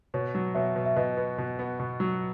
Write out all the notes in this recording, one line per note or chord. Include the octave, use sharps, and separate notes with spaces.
B2 C#5
F#3
B2 C#5 E5
B2
E5
B2 B4 D#5
B3
B2
B3
B2
F#3